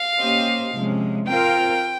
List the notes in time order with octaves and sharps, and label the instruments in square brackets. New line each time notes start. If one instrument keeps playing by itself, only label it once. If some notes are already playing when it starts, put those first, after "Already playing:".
Already playing: [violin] F5
[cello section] A#3 C#4 G4 C5 D#5
C3 F3 G#3 C#4
[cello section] C4 F4 A#4 [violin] G5